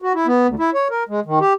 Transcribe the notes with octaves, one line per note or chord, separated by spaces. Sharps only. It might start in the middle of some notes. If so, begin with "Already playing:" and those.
F#4
E4
B3
D2
E4
C#5
A#4
G#3
D#3
G4